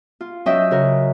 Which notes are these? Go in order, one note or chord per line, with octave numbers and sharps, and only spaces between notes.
F4
F#3 C#4 D#5 E5 G5 E6
C#3 F#4 A#4